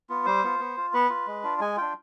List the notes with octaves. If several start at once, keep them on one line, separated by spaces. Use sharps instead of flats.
B3 F4
G3 C5
B3 F4
B3
F4
B3 B4
F4
G#3
D4 F4
G#3 G#5
D4 F4 G5